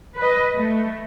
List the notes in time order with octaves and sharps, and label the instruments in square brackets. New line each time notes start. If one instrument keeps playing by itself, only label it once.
[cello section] B4 D#5
A3